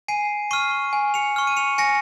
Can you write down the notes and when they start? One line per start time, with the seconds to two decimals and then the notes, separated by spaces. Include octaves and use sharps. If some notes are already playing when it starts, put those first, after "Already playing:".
0.08 G#5 C7 D#7
0.51 C#6 F6 C7 D#7
0.93 G#5
1.14 C#7 F7
1.36 C#6 F6
1.47 D#7
1.56 C#7 F7
1.78 G#5 A#6 C#7